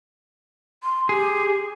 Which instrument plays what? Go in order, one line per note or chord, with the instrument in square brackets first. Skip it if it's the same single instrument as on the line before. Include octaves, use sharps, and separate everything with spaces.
[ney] C6
[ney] G4 [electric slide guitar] G#4